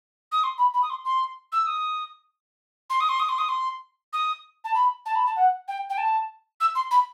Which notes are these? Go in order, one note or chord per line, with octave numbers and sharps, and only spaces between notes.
D#6
C6
B5
B5
D#6
C6
C6
E6
D#6
C6
D#6
C6
D#6
C6
D#6
C6
D#6
A5
B5
A5
B5
A5
F#5
G5
G5
A5
E6
C6
B5